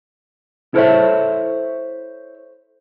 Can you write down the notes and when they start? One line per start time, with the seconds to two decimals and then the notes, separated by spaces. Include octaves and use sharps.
0.74 E4 A4 A#4 C5 C#5 E5